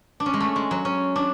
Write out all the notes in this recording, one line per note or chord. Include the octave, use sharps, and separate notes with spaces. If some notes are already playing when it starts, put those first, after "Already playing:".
D4
C#4
G#3
A3
G#3
F#3
C#4
D4